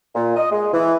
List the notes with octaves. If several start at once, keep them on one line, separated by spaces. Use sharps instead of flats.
A#2
D#5
G#3
E3